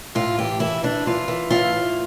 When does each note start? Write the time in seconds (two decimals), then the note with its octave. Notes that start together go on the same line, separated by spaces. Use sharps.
0.15 A2 F4
0.38 E3 G4
0.60 E3 E4
0.83 E3 D4
1.06 E3 F4
1.28 E3
1.50 A2 F4
1.73 A2